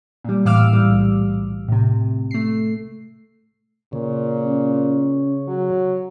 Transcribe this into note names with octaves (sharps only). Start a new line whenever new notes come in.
A#2 G3
A2 E3 F5 D6 E6 F6
G3
B1
A2 C3
A3 C7
A#2 C#3
C#4
F#3